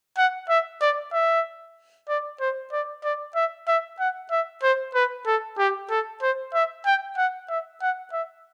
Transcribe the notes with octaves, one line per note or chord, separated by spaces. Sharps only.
F#5
E5
D5
E5
D5
C5
D5
D5
E5
E5
F#5
E5
C5
B4
A4
G4
A4
C5
E5
G5
F#5
E5
F#5
E5